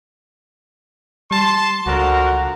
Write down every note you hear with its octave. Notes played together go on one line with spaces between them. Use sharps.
G3 A5 C6
C#2 D3 F3 F#4 A#4